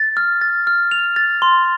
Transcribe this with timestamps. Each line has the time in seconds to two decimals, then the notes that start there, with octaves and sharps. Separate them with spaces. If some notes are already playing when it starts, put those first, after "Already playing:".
Already playing: A6
0.17 F6
0.41 A6
0.67 F6
0.91 F7
1.16 A6
1.42 C6